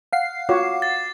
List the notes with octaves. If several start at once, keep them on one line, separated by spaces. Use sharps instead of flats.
F5 F#5 C7
F4 F#4 C#5 D6
A6